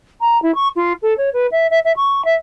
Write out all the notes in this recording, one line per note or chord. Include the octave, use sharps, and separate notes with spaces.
A#5
E4
C#6
F4
A4
C#5
B4
E5
E5
E5
C#6
E5